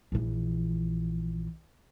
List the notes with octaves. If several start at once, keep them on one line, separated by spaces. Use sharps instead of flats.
A#1 E3